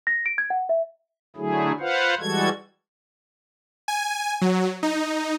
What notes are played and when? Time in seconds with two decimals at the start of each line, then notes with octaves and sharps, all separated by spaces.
0.07 A#6
0.26 D7
0.38 G#6
0.50 F#5
0.69 E5
1.36 D3 F#3 A3 E4 G#4
1.79 F4 B4 C5 F5 F#5
2.20 E3 G3 G#3 F#4 A4 G#6
3.88 G#5
4.41 F#3
4.83 D#4